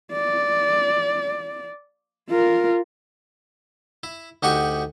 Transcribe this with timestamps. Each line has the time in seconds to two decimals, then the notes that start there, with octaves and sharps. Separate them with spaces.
0.13 D5
2.29 F4 A#4
4.03 E4
4.43 D2 D#4 F#4 G4 F#5 C#6